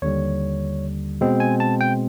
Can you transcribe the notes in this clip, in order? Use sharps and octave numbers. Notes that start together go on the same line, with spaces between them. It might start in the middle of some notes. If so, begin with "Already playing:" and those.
D#2 D3 G3 C#5
B2 G#3 C4
G#5
A5
G5